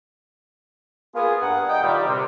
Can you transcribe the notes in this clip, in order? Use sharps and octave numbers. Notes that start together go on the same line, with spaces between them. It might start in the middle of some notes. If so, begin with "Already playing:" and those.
A#3 B3 F4 G#4
G2 G3 G#4 A#4 F#5
D#5 G5
A#2 D#3 G3
C3